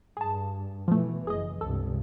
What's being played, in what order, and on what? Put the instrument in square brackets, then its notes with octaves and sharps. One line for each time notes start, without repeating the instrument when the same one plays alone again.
[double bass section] G2 [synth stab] G#4 A5
[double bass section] B2 E3 [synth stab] F3 A3
[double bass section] F#1 [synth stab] G#4 D#5
[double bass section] C#2 G2 C3 [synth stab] A4